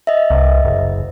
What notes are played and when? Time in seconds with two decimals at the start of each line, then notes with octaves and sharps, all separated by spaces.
0.07 D#5 E5
0.30 C2
0.64 F#1